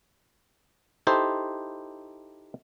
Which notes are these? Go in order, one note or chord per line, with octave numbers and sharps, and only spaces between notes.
D#4 E4 G4 A4 C5